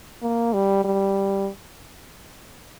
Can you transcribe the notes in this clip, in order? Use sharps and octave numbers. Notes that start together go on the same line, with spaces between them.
A#3
G3
G3